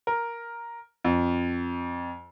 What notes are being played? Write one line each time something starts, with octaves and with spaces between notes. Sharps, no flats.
A#4
F2